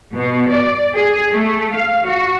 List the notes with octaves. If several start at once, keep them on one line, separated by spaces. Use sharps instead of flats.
B2
D5
G#4
A3
F5
F#4